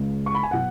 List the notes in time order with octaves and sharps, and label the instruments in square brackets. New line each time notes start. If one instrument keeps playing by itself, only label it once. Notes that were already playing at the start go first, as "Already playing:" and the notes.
Already playing: [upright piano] C#2 C#3 G#3
C#6
B5
G#5
B2 F#3 F#5